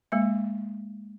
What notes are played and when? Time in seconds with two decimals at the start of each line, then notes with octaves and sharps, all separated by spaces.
0.12 G#3 A#3 E5